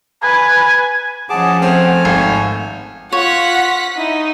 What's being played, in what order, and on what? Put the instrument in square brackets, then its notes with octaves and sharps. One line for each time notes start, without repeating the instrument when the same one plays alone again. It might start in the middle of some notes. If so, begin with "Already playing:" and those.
[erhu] B4 [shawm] G#5
[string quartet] F3 G#3 C#4 [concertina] G#4 A5 D6 [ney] F#5
[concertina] A3 G#5 F6 [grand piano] C4
[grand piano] G#1 [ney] F5
[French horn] F4 [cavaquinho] C#5 [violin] F#5 B6
[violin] D#4 [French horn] E4